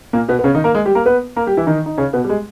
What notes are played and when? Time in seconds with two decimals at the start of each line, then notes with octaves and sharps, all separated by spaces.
0.13 A#2 A#3
0.28 B2 B3
0.39 B3
0.44 C#3 C#4
0.55 D#3 D#4
0.64 A#3 A#4
0.75 G#3 G#4
0.85 G3 G4
0.95 A#3 A#4
1.06 B3 B4
1.36 A#3 A#4
1.47 G3 G4
1.57 E3 E4
1.67 D#3 D#4
1.86 D#4
1.98 C#3 C#4
2.13 B2 B3
2.24 G3
2.29 G#3